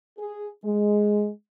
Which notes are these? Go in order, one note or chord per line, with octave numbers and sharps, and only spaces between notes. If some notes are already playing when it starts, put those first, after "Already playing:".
G#4
G#3